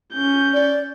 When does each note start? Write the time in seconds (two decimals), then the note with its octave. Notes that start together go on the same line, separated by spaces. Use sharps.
0.13 C#4 G6
0.53 D5